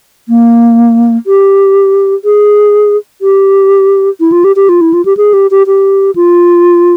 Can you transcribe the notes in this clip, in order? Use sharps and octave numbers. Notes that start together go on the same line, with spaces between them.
A#3
G4
G#4
G4
E4
F4
G4
G4
F4
E4
F4
G4
G#4
G4
G4
G4
F4